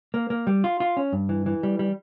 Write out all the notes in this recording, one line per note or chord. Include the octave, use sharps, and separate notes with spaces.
A#3
A#3
G3
F4
F4
C#4
G2
E3
E3
G3
G3